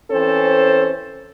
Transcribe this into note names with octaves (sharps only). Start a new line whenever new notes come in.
E3 C4 C#4 A4 C5